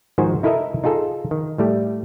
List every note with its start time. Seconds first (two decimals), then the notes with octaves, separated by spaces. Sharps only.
0.18 G#2 D#3 F3 F#4 C5 G#5
0.43 D#4 E4 A4 A#4 D#5 E5
0.84 D#4 F4 G#4 A4
1.31 D#3
1.58 A2 G3 A3 G4